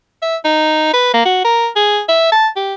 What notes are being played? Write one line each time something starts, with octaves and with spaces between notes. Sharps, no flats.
E5
D#4
B4
A#3
F#4
A#4
G#4
E5
A5
G4